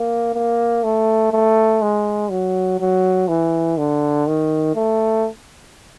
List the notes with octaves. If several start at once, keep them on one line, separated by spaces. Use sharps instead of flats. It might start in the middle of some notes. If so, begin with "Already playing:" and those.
Already playing: A#3
A#3
A3
A3
G#3
F#3
F#3
E3
D3
D#3
A3